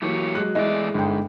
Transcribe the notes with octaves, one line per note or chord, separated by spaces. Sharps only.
E3 F#3 A3 A#3 G4 C#5
F#3 G#3 F#6
E2 G#3 A3 E4 G#4 D5 D#5
G1 G#2 G5